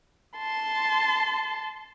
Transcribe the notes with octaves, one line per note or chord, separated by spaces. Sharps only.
A5 C6